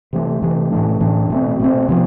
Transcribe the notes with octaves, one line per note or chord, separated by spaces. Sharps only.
C3 E3 A3
C3 E3 A3
A2 E3 A3 D4
A2 E3 A3 D4
B2 A3 C4
B2 A3 C4
C3 F3 B3